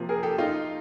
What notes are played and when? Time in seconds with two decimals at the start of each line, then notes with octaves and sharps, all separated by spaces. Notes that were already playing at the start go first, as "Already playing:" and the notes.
Already playing: C3 F3 A#3
0.09 G#4 A#4
0.23 G4 A4
0.38 D#4 F4